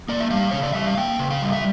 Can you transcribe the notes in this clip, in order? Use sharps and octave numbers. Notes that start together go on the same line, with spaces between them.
A#3 D5
E5
G3 F5
C#3 C#5
D5
G3 E5
F5
A#3 G5
C#3
F5
G3
E5